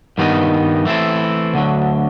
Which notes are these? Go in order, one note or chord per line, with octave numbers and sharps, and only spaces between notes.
G2 D#3 G3 B3 D#4
E3 A3 C4 E4
D2 D3 F#3